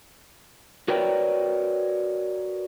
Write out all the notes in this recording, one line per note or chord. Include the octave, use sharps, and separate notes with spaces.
F#4 A#4 B4 C#5 D5 G5